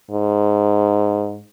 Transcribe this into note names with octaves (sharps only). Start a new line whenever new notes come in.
G#2